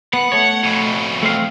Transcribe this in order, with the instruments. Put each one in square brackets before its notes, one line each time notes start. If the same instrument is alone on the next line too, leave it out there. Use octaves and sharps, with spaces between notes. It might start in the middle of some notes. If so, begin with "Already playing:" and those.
[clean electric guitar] B3 [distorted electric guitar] F#5
[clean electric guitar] A3 C#5
[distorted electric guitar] F2 B2
[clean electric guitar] A3 C4 F5